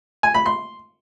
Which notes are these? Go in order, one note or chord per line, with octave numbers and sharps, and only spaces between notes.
G#5
B5
C6